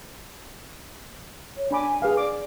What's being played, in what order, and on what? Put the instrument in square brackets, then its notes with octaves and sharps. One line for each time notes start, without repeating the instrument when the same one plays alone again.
[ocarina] C#5
[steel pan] D4 B5 D6 [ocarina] G#5
[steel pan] G#4 F5 [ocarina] B4
[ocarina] D5 [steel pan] D6